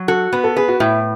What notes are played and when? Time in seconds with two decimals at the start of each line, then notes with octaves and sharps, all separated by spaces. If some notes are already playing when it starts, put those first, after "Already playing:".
Already playing: F#3
0.08 F#4 A4
0.32 B3 B4
0.44 A4
0.56 G#4 B4
0.68 F#4
0.80 A2 E4